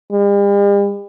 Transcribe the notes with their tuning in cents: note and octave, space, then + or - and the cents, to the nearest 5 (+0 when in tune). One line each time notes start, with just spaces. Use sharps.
G3 +45